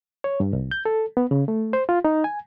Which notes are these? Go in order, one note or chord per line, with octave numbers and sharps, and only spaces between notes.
C#5
G2
C2
G6
A4
B3
C#3
A3
C5
F4
D#4
G#5